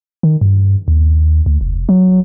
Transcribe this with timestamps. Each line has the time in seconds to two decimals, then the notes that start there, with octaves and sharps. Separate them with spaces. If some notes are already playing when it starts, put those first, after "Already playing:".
0.23 D#3
0.41 G2
0.88 D#2
1.46 D2
1.61 F1
1.89 F#3